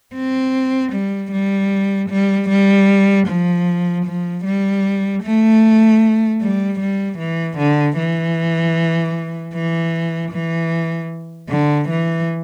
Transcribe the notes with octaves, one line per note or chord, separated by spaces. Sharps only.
C4
G3
G3
G3
G3
F3
F3
G3
A3
G3
G3
E3
D3
E3
E3
E3
D3
E3